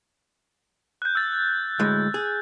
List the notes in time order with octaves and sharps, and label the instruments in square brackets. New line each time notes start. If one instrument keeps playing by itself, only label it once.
[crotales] F#6 G6
E6 A6
[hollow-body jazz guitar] D2 A2 G#3
G#4